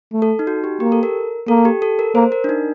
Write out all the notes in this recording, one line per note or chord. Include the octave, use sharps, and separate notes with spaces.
A3
A4
D#4
F#4
G4
A#3 G4
A4
A#4
A#3 A4
G4
A4
A#4
A#3 C5
A#4
D4
D#4